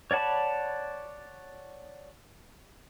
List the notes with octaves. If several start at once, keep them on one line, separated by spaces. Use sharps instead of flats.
C#5 D5 F#5 A5 B5